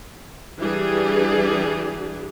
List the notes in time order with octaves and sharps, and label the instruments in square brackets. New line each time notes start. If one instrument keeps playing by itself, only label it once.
[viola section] E3 G3 D4 G4 G#4